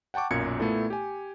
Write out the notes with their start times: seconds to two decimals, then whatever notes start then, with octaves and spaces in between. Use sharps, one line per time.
0.14 F#5 G5 A5 C#6 D6
0.31 B1 F#2 A#2 A#4 G#6 C#7
0.60 A#2 A3 B3 E4 A4
0.90 G4 G#5